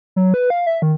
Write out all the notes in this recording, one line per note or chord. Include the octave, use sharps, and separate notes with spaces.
F#3
B4
F5
E5
D#3